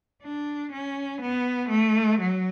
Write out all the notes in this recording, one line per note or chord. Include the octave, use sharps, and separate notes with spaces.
D4
C#4
B3
A3
F#3